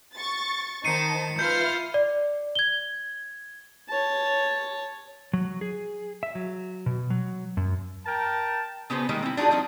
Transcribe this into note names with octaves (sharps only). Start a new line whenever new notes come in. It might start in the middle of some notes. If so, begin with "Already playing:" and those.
C#6 A6
D#3 D#4 C5 A5 C7 C#7 D#7
F4 B4 E5 F6 G6
D5
G#6 G7
C#5 A5
F#3
G#4
E5
F#3
B2
F#3
F#2
A#4 G5 A5
C#3 B3 F#4 G#4 C5
D#3 G3 G#3 A#3 D#4
C4 E4
D4 D#4 F4 F#4 G#4
F3 G3 C4 D4 D#4 D5